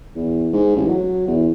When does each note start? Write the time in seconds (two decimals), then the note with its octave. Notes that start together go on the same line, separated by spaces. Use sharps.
0.16 E2
0.53 G#2
0.76 A1
0.89 F#3
1.27 E2